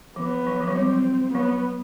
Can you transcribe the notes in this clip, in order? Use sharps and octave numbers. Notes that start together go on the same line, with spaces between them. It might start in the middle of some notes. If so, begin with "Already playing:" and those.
F3 B3
F#3
F3
F#3
G3 C4
F#3 B3